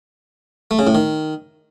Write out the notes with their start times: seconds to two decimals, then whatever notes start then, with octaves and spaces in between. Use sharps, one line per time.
0.71 A3
0.79 C#3
0.87 A2
0.95 D#3